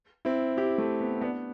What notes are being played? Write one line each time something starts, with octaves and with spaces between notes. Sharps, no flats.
C4 E4
E4 G4
A3
B3
B3 D4